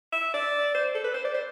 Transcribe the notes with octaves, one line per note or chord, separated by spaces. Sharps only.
E5
D5
C5
A4
B4
C5
D5
C5